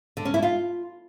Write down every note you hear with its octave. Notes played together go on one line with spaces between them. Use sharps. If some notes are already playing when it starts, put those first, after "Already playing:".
D3
C#4
E4
F4